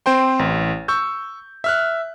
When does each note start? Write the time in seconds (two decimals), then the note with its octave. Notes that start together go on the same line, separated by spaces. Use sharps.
0.06 C4 C5 G5 C6
0.39 A1
0.88 C#6 E6 G6
1.64 E5 F6 F#6